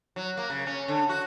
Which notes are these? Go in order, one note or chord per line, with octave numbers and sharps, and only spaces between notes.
F#3
A#3
C#3
C#4
D3
F#4